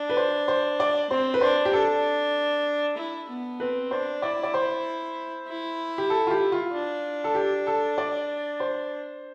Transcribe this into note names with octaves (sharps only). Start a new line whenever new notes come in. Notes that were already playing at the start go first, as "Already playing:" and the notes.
Already playing: D4
B4
C5
C5
D5
C4 C5
B4
D4 C5
G4
D4 A4
E4
B3
C4 B4
D4 C5
E4 D5
D5
C5
E4
G4
A4
F4
G4
F4
D4
A4
G4
A4
D5
C5